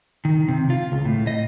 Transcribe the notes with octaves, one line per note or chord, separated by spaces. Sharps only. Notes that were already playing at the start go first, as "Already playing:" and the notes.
D#3
C3
F4
C#2
A2
D#5